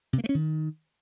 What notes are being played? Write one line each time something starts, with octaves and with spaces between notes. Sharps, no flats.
C3
A#3
A3
C#4
D#3